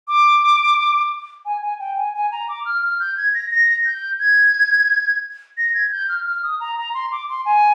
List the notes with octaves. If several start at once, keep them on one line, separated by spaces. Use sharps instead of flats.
D6
G#5
G#5
G5
G#5
G#5
A#5
D6
F6
F6
G6
G#6
A#6
A#6
G6
G#6
A#6
G#6
G6
F6
F6
D#6
A#5
A#5
C6
D6
C6
G#5